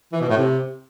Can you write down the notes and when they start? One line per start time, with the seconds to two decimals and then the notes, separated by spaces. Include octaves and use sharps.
0.12 E3
0.21 B2
0.29 A2
0.37 C3